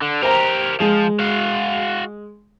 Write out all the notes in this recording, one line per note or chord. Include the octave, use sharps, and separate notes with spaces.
D3
G4 A#4 C5 A#5
F3 G#3
F#4 F5